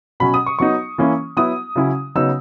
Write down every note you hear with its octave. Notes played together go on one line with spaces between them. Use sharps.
B2 F#3 C#4 B5
D#6
C#6
F#3 B3 D#4 C#6
E3 A#3 C#4 E4
F#3 B3 E4 D#6
C#3 F#3 C#4 E4
C#3 F#3 B3 D#4 E6